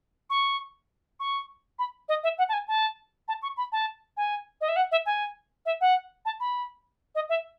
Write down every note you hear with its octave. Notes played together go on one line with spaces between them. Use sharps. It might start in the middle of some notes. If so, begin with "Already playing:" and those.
C#6
C#6
B5
D#5
E5
F#5
A5
G#5
A5
A5
C#6
B5
A5
G#5
D#5
E5
F#5
E5
G#5
E5
F#5
A5
B5
D#5
E5